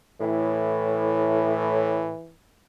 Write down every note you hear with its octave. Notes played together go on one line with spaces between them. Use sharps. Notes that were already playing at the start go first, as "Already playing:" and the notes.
A2 E3